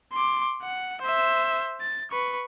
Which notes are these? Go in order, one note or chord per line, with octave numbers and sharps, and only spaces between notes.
C6 D6
F#5
C5 E5
A6
B4 C#6